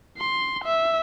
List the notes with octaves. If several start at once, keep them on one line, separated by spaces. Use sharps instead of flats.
C6
E5